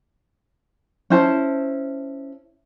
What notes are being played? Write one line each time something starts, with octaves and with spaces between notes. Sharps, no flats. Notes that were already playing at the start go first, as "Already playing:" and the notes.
C#4 E4 C5 A5